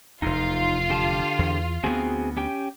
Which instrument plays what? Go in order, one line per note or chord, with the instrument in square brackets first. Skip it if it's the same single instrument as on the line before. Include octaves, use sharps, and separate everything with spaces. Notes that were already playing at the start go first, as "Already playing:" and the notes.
[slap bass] F1 E2 [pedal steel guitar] D#4 [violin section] F4
[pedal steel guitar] D3 G4 A5
[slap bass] E2
[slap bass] D2 F3 B3 [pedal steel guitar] C4 F#4 G#4
[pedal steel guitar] C#4 G4 G5